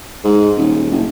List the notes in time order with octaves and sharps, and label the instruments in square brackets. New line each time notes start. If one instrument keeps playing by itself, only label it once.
[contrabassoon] G#2
D#1
F#1